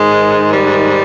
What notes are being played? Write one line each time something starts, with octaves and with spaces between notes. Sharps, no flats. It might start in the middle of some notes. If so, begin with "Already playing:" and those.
Already playing: G#2 D#3 G#3
G3